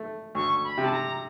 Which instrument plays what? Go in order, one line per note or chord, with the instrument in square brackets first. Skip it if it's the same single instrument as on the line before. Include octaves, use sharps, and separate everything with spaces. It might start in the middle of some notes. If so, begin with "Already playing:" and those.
Already playing: [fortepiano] A3
[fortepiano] D2 [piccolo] C#6
[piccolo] B5
[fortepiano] C3
[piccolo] A5
A#5